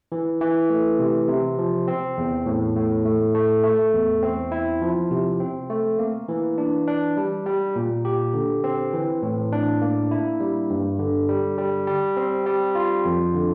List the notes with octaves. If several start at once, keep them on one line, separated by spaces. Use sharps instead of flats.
E3
E3
A3
C3
C3
F3
C4
E2
A2
A2
A3
A3
A3
E2
C4
E4
F3
C3
C4
A3
A#3
E3
D4
D4
G3
G3
A#2
G4
D3
C4
E3
A2
D4
A#3
E4
G3
G2
D3
G3
G3
G3
C4
G3
F4
F2
D3